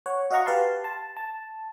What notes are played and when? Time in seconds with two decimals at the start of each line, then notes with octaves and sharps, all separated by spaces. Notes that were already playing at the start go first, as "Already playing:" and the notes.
0.06 C#5 F#5
0.31 F#4 D#5 F5 F#5 A#5 C#6
0.46 G4 B4 F5 A5 C6
0.84 A5
1.17 A5